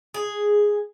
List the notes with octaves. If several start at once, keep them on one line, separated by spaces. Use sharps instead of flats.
G#4